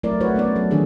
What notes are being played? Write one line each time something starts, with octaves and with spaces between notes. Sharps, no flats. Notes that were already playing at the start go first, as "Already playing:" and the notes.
F#3 A3 C4 E4 A#4 D5
E4 F#4 B4 C#5
A3 B3 C#4 D5
F#3 A4
D#3 E3 F#3 D4 G#4